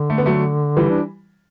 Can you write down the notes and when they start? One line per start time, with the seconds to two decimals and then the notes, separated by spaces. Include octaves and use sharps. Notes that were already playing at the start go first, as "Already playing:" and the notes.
Already playing: D3
0.10 A3
0.18 B3
0.26 F#3 A3
0.77 E3 G3
0.90 D4